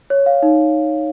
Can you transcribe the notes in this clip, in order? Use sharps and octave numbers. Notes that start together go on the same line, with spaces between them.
C#5
F5
D#4